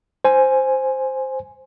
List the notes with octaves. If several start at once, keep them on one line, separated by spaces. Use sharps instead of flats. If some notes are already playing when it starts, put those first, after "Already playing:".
C5 G#5